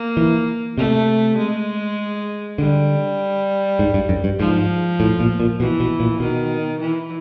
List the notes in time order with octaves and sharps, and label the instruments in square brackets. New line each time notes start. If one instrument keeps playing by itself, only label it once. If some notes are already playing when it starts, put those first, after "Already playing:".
Already playing: [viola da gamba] A#3
[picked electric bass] E3
[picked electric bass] C3 [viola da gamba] A3
[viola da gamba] G#3
[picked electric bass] D3 [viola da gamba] G3
[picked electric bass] G#2
G2
F#2
G2
[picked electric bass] G#2 [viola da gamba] F3
[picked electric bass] A2
A#2
A#2
[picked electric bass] B2 [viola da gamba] E3
[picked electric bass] B2
A#2
[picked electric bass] B2 [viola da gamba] D#3
[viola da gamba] E3